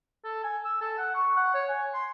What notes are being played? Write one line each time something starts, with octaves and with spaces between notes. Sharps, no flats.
A4
G#5
E6
A4
F#5
C#6
F#5
C#5
G#5
C6